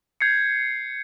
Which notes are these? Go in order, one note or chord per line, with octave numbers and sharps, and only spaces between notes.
G6 G#6 C7 C#7